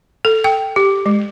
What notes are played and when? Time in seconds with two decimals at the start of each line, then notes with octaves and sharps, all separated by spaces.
0.25 A4
0.44 G5
0.76 G4
1.06 G#3